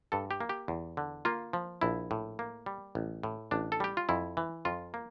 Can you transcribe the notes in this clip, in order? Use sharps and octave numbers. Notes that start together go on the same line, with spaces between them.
G2 A4
G4
A#3
G4
E2
D3
A#3 F4
F3
A#1 E4
A2
A#3
G3
A1
A2
A1 D4
A4
G3 G4
F4
F2 E4
E3
F2 F4
A#3